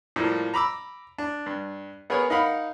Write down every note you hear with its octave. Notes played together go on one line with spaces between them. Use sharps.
A2 F3 G3 A#3
A#5 B5 D6 E6
D4
G2
B3 G#4 A#4 B4 C#5
D#4 A#4 F5 F#5 B5